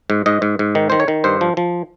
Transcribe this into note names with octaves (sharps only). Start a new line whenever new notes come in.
G#2
G#2 D#5
G#2
G#2
D#3
D#3 C5
C#5
D#3
G2 C5
F3
F3